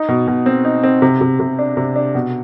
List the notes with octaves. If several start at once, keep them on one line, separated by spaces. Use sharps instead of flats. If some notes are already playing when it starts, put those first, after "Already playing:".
Already playing: D#4
B2
B2
C4
D#4
C4
C3
C3
C3
D4
C3
D4
B2